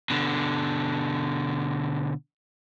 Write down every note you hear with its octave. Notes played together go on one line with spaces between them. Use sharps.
B2 D3